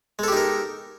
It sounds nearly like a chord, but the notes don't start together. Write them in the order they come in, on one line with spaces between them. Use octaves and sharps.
G#3 A4 G4 D#4 A#4